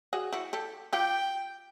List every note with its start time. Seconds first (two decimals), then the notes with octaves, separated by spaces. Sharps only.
0.13 F#4 G#4
0.33 E4 F#4
0.53 G4 A4
0.93 F4 G4 G5